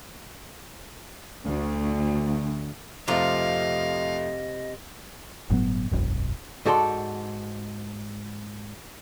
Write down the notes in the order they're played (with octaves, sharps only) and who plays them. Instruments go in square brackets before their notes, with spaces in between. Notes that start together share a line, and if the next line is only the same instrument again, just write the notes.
[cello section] D2
[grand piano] F2 F3 A3 [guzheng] C3 F4 A#5 [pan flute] D#5 [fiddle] F5
[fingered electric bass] G1 A2 F#3 B3
E1 B1 F#2
[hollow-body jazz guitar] G#2 F#4 A4 D5 A#5 C6